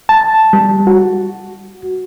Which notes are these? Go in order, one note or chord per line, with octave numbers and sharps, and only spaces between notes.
A5
G3
F#4